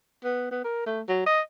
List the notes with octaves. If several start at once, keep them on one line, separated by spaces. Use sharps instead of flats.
B3
B3
A#4
A3
F#3
D#5